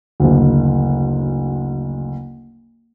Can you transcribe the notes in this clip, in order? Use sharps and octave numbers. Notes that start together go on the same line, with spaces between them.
F#1 D2